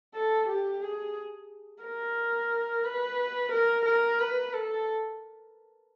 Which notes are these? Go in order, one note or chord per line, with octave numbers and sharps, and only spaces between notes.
A4
G4
G#4
A#4
B4
A#4
A#4
B4
A4